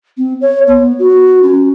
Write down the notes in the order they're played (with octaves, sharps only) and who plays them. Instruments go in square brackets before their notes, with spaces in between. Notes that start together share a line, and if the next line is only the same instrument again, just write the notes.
[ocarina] C4
C#5
B3
F#4
C#4